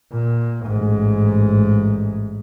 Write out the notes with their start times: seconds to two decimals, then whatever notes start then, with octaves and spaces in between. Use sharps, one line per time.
0.12 A#2
0.66 A1 G#2